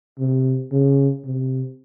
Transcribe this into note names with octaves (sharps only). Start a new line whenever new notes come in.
C3
C#3
C3